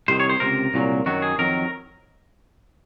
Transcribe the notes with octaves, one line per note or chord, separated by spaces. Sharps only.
C2 C3 D#3 C5
C#5
C5
C#2 C3 A#4
C2 A#2 F#3
F#2 D#3 F#3 F#4
G#4
F2 D#3 F#3 A#4